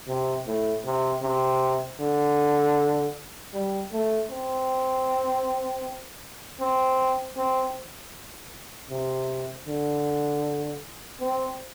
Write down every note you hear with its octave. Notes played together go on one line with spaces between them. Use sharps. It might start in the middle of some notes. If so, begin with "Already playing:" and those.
C3
A2
C3
C3
D3
G3
A3
C4
C4
C4
C3
D3
C4